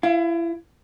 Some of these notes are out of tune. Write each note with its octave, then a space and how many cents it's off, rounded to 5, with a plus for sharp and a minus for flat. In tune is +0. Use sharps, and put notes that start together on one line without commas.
E4 +30 F5 +0